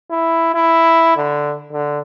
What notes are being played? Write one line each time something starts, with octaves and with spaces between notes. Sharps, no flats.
E4
E4
D3
D3